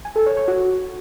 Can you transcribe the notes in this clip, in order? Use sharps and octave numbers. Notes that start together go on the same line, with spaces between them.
G#5
A4
C#5
C#5
F#4